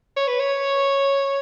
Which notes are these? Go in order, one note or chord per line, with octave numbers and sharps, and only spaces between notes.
C#5
B4
C#5